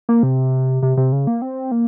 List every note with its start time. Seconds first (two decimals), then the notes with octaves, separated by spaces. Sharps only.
0.09 A#3
0.23 C3
0.83 C3
0.97 C3
1.12 C#3
1.27 A#3
1.42 C4
1.71 A#3